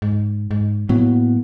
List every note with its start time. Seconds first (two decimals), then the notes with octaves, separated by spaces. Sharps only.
0.02 G#2
0.51 G#2
0.89 A2 F#3 A#3 B3